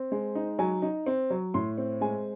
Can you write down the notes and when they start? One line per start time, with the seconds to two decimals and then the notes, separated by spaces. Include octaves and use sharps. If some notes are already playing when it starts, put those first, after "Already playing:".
Already playing: C4
0.12 G#3
0.35 D#4
0.59 F#3 G#5
0.82 D#4
1.06 C4
1.30 F#3
1.54 A2 C6
1.78 C4
2.01 G#3 G#5